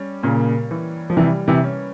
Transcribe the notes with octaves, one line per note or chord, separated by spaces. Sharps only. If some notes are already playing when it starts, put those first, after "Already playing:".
Already playing: G3 C#4
A#2 C#3 A#3
E3
F3
C3 E3 G3
C3 E3
C#4